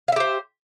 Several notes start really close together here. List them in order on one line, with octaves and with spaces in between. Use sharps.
F5 E5 G4 C5